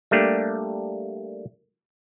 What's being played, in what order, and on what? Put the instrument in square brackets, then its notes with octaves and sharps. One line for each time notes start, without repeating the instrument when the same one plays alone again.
[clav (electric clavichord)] G3 A3 A#3 D4 G4